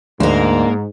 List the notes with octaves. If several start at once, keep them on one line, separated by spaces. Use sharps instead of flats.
D2 G#2 A#3 D4 A#4 A#5